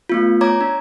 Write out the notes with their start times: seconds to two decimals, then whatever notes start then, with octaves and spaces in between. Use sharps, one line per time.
0.09 A3 B3 F4
0.41 C#5 A#5 D6 G#6
0.61 D4